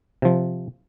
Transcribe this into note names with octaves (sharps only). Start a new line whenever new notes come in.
C3 F3